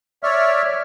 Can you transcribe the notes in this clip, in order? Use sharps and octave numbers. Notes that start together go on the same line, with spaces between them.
C#5 D5 E5 F6